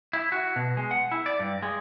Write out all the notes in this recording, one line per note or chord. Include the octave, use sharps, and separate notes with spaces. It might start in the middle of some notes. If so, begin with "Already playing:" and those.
E4
F#4
B2
G#3
F#5
E4
D5
G2
G#3